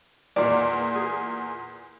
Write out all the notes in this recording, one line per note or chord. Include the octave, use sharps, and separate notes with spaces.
E2 A#2 D5
G#4